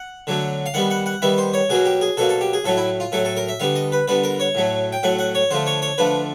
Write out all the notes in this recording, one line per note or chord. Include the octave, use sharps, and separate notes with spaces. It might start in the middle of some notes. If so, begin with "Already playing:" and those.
Already playing: F#5
D3 F#3 A3
F5
D#3 G3 B3 F#5
F#5
F#5
D#3 G3 B3 E5
C5
C#5
B2 F#3 A#3 G#4
G4
G#4
B2 F#3 A#3 A4
A4
G4
G#4
A2 F#3 A3 A4
E4
F4
A2 F#3 A3 A4
A4
A#4
E5
D3 G3 B3 F5
D#5
B4
D3 G3 B3 B4
A#4
C#5
A2 F#3 A3
G5
A2 F#3 A3 F#5
F#5
C#5
D3 F3 A3 C5
C#5
C#5
D3 F3 A3 B4